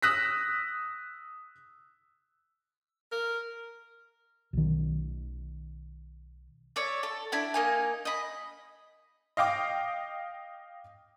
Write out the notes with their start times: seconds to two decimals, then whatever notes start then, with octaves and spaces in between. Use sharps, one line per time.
0.02 D#6 E6 F#6 A#6 B6
3.12 A#4
4.53 B1 D#3
6.76 C#5 D5 E5
7.03 A4
7.32 D4 E4 B5
7.54 A#3 D#4 G#5
8.05 D#5 B5
9.37 D#5 F5 G5 D6